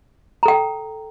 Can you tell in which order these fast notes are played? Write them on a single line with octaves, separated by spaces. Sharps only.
A#5 A4 G5